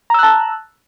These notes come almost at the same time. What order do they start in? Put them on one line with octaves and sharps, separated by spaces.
A#5 E6 F#6 A5